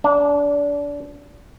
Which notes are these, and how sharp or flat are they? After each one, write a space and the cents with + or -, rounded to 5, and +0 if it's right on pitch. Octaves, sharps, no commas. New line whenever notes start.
D4 -25